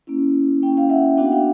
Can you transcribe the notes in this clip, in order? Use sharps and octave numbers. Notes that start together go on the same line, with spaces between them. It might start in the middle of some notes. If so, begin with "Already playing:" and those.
A#3 C#4 E4
A#3 C#4 E4 G5
F5 G5
E5 F#5
B3 D4 F#4 G5
F#5
F5 G5